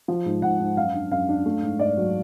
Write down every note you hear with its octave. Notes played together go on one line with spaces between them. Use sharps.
F3
G#2
G#2 F#5
G#2
F#2 F5
D4
F#2 F5
D4
A3
G#2
G#2 D5
F#3